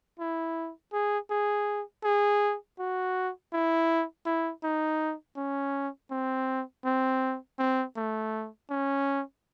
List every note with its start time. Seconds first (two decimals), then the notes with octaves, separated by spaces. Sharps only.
0.19 E4
0.93 G#4
1.30 G#4
2.04 G#4
2.79 F#4
3.53 E4
4.26 E4
4.63 D#4
5.36 C#4
6.11 C4
6.85 C4
7.59 C4
7.97 A3
8.70 C#4